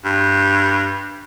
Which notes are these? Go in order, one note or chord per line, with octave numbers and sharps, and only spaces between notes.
G2